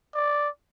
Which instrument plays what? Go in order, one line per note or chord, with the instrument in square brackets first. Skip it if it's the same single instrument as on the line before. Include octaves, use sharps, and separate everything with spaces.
[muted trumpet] D5